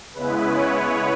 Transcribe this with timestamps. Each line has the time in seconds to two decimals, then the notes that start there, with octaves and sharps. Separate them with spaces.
0.14 C#3 G#3 B3 E4 B4
0.45 C#5
0.76 B4